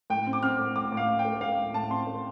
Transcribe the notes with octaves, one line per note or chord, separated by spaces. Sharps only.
A2 G5
C4
D6
C4 F6
A2
A2 D6
A2
F5
A2
G5
A3
A3 F5
A2
A2 A5
C4 C6
A3